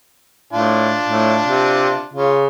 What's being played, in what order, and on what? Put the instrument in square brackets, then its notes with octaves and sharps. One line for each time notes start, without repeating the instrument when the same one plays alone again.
[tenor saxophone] A2 [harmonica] D4 F4 A5
[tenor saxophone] A2
C3
[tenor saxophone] C#3 [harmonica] F4